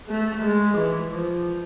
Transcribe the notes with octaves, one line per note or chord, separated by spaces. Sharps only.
A3
G#3
E3
F3